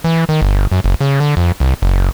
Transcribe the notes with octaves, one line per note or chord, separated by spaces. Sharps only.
E3
D#3
G1
F#2
F#1
C#3
D3
F2
C2
F#1